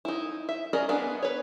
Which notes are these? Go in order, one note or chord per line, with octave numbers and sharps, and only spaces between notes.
D#4 E4
E5
C#4 G#4 A#4 D5 D#5
B3 D4 G#4 D5
B4 C#5